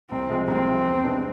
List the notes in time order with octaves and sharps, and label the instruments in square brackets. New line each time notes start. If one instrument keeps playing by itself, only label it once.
[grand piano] C2 [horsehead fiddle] C4
[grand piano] C3 F3 G#3
[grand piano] C2 [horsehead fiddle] C4
[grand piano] C3 F3 G#3
E2
C3 G#3 B3 D4